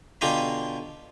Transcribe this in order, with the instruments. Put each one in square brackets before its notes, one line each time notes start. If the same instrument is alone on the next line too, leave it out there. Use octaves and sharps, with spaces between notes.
[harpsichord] B2 D3 F4 G4 G#5 A#5